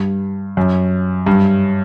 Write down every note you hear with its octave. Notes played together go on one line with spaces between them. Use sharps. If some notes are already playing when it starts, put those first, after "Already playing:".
Already playing: G2
F#2
G2